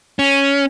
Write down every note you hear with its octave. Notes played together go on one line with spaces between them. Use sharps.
C#4